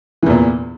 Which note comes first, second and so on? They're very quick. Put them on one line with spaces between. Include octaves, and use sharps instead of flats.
E3 E2 A#2